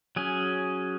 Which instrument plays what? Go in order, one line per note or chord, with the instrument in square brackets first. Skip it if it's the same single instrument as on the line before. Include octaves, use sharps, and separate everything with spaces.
[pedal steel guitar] F#3 C#4 G#4